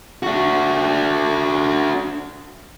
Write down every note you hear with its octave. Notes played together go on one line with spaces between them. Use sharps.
D4 F#4